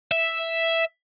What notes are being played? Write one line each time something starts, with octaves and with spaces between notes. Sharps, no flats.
E5